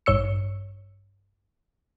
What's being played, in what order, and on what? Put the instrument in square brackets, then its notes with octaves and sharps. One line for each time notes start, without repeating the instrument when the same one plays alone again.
[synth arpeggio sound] A1 G2 C#5 E6 C#7